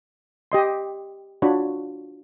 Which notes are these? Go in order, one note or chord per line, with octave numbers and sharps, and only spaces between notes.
G4 D#5 C6
D4 F4 F#4 C#5 B5